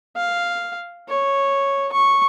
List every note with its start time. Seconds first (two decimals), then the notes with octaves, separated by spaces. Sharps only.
0.17 F5
1.09 C#5
1.92 C#6